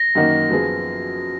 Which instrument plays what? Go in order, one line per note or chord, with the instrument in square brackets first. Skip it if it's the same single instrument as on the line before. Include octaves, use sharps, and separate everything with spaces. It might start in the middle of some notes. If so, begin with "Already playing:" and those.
Already playing: [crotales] A#6
[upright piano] F#2 D#3 A#3 D#4 F#4
F#2 F3 B3 F4 G#4